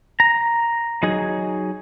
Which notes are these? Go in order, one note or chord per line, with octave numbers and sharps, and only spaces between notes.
A#5
F#3 D#4 G#4